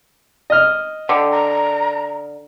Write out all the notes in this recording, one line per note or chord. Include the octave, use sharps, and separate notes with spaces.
D#5 F6
D3 G5
A#5